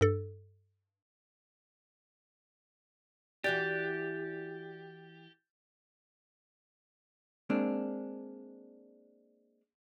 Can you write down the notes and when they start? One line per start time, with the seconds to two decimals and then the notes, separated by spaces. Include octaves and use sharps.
0.01 G2 A4
3.44 E3 F#4 G4 D5 G6 A6
7.50 G#3 A#3 C4 D4